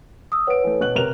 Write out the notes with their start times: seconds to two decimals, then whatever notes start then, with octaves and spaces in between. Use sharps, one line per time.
0.32 D#6 E6
0.47 B4 C#5 F#5 D7
0.64 E3 A3
0.81 B2 F#6 F#7
0.95 C3 A#4 F7